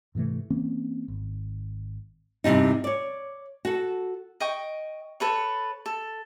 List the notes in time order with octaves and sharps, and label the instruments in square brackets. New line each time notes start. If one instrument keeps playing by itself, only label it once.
[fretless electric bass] G#2 C3 E3 A3
E3 A#3 C4 C#4
G#1
[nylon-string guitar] E2 G2 C3 G3 D#4
C#5 D5
F#4 A4
[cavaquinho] D#5 G5 C#6
A4 B4 C#5
A4